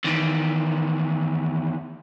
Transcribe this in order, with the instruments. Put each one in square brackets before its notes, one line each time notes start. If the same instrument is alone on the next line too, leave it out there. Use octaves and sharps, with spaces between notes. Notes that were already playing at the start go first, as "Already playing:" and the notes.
[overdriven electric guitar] E2 D#3